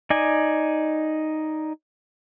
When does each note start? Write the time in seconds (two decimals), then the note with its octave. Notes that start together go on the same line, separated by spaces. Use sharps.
0.10 D#4 D5 G#5